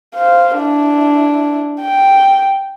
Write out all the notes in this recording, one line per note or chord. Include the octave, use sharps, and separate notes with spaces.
C5 F5
D4 E4
G5